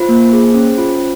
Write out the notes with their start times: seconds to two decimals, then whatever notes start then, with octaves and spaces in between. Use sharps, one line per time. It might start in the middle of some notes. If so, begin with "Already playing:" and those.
Already playing: F4 C5
0.09 A#3
0.33 G#4
0.54 C#4
0.78 F4